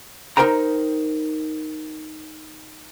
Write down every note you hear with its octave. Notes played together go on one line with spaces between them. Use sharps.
D#4 G4 A#4 C5 G5 A#5